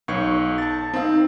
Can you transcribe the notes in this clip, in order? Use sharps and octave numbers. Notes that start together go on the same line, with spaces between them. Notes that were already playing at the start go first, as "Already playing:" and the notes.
B1 D#4 C#5 C#6
A5 A6
C4 D#4 F5